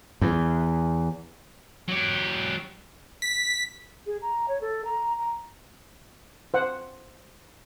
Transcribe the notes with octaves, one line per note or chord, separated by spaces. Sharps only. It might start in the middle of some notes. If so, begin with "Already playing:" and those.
E2
F#3 G4
B6
G#4
A#5
C#5
A4
A#5
A#5
C5 F#5